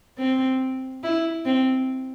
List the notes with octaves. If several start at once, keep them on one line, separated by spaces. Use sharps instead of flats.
C4
E4
C4